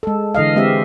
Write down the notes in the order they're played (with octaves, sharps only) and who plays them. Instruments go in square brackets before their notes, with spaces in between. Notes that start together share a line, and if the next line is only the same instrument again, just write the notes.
[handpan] G#3 A4
D3 E3 D#5 F5
G#3 C4 G4 E5